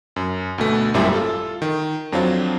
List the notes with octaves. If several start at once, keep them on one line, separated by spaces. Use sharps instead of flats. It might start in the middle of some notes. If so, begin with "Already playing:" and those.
F#2
D2 B2 A3
G#1 F#2 A#2 G3 E4 E5
F4 A4
D#3
F2 F#3 C4 D4 F4